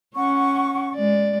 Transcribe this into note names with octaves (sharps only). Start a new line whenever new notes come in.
C#4 F#5 C#6
G#3 D5